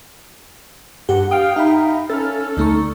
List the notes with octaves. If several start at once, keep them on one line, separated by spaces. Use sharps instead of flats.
G2 G4 F#5
F5 G5 D#6 F6
D#4 E5 F5 B5
C#4 A4 F6 A6
D2 A3 D#4 C#6